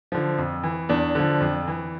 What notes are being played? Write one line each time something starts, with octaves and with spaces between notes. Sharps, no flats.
D3 F3
F2
E3
E2 D4
D3 F3
F2
E3